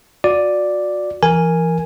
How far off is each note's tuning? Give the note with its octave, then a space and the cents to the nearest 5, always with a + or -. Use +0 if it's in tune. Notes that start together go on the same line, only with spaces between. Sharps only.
F#4 -30 D5 +0
E3 +35 A#4 +0 G#5 -5